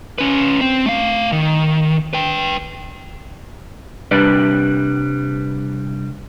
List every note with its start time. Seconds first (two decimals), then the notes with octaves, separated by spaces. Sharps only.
0.18 C#4 B4
0.61 C4
0.86 A3 F5
1.32 D#3
2.13 B4 G5
4.11 C2 G3 D4 B4 D5